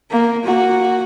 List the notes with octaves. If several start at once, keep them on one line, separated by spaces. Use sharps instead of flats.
A#3
A#3 F#4